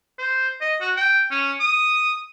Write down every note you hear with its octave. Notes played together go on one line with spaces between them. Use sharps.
C5
D#5
F#4
G5
C#4
D#6